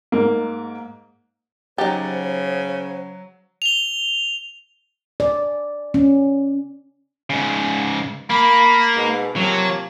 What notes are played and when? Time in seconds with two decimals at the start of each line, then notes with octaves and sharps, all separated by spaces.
0.12 G#2 A#3
1.78 C#3 F#3 D#4 G4 C5 F#5 A6
3.62 F7 G7
5.20 D5
5.94 C#4
7.30 G#2 C#3
8.30 A#3 B5
8.96 G#2 B2
9.36 C3 F3 F#3 A#3